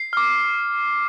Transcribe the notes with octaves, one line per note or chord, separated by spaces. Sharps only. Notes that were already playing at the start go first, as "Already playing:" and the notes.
Already playing: C7
D6 F6